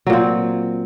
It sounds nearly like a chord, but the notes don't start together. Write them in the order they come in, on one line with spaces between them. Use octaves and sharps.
F#3 A#2 C4